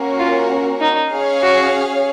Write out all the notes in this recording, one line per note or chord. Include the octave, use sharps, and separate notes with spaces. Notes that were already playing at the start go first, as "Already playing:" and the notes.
Already playing: A#3 C#4 F#4 A#4
F4
D#4
C#4 G#4 C#5 F5
F#4